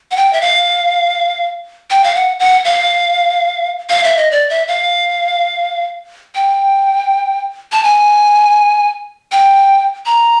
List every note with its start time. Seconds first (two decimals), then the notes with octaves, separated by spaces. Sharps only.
0.11 F#5
0.16 G5
0.33 E5
0.41 F5
1.90 G5
2.04 F5
2.15 F#5
2.40 F#5
2.65 F5
3.89 F5
4.04 E5
4.17 D#5
4.31 D5
4.50 E5
4.68 F5
6.35 G5
7.72 A5
7.83 G#5
9.32 G5
10.06 A#5